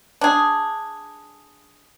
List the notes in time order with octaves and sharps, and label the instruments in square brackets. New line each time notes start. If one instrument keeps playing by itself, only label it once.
[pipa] D4 G#4